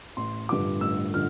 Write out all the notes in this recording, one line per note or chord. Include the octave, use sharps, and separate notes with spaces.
A1 C6
G2 D3 F3 D6
A1 E6
D3 F3 F6